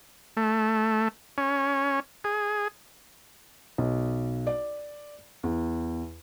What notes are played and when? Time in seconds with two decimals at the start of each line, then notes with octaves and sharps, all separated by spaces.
0.37 A3
1.38 C#4
2.24 G#4
3.78 B1
4.47 D5
5.43 E2